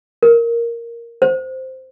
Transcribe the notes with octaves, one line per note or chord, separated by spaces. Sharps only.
A#4
C5